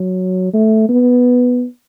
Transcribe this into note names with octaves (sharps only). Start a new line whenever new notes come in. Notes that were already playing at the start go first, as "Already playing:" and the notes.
Already playing: F#3
A3
B3